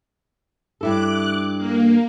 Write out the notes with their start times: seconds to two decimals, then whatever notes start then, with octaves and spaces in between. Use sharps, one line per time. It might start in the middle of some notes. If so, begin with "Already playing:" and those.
0.81 G2 E4 A4 D6 F#6
1.57 A#3